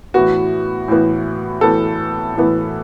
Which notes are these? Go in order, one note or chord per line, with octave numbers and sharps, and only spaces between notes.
A2 E3 B3 F#4
A2 E3 B3
A2 E3 B3 A4
A2 E3 B3